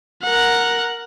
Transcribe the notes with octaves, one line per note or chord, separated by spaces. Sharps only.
A#4 F#5